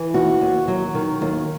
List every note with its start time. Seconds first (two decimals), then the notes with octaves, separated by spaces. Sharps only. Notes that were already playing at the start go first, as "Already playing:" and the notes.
Already playing: E3
0.14 D#2 F#4
0.41 D#2
0.68 F#3
0.95 D#3
1.22 D#2